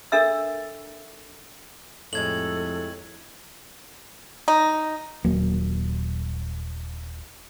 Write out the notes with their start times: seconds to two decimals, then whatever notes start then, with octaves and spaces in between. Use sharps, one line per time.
0.12 D4 A4 A#4 E5 E6
2.13 F2 A2 C3 G#3 A4 G#6 F#7
4.48 D#4
5.24 D#1 F#3 A#3